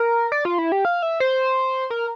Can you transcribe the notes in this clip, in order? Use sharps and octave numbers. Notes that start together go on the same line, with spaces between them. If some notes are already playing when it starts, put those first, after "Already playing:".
Already playing: A#4
D5
F4
E4
G4
F5
E5
C5
A#4